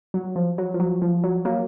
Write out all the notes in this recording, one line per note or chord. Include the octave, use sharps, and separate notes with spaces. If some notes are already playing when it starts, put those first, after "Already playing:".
F#3
F3
F#3
F3
F#3
F3
F#3
F#3 A#3